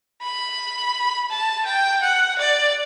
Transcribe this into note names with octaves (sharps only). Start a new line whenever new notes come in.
B5
A5
G5
F#5
D5